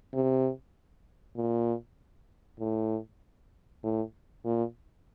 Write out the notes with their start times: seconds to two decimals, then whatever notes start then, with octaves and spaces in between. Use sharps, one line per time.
0.13 C3
1.36 A#2
2.60 A2
3.83 A2
4.45 A#2